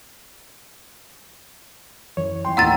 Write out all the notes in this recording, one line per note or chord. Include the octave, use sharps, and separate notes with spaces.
F#2 E3 C#5
E3 G5 C6
D#2 A2 F#5 A#5 E6 A6